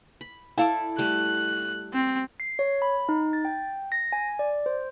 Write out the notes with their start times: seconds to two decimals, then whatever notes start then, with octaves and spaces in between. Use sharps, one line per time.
0.21 B5
0.58 E4 A4 D5 F5 A5
0.98 G3 A3 F#6
1.94 C4
2.40 C7
2.59 C#5
2.82 B5
3.09 D#4
3.33 A6
3.45 G5
3.92 A#6
4.12 G#5
4.39 D5
4.66 C5